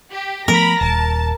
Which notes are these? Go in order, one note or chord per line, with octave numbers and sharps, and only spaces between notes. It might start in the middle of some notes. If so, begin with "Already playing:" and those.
G4
F3 A3 B3 A#4 B5 A#6
D#1 A5